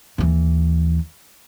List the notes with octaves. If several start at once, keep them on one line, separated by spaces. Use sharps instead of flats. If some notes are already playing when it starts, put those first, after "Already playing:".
D#2 E3